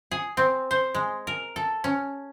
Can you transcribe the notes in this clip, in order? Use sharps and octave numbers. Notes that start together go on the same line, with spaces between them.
G#4
C4
C5
G#3
A#4
A4
C#4